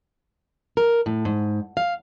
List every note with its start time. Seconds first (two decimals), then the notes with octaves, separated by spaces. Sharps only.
0.77 A#4
1.06 A2
1.25 G#2
1.77 F5